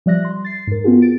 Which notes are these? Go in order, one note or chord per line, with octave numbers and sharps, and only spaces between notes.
F3 G3 D5 E5 F#6 A#6
C6
A6 C7
G#2 A#4
B3 C4 F4 F#4 G#4
A6 D7